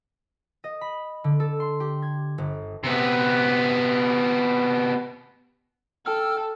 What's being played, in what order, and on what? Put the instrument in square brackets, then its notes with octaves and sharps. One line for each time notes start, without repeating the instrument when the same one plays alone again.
[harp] D#5
B5
D3
A4
C6
G4
G#6
G1
[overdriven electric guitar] C3 B3
[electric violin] A4 [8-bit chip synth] G5 E6 F6